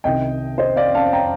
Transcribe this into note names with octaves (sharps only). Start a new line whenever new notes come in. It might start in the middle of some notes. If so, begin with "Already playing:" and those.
C2 C3 D#3 D#5 G5
C5 D#5
D5 F5
F5 A5
G5 A#5